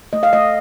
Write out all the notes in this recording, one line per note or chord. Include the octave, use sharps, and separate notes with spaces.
A3 D#5
F5
A3 D#5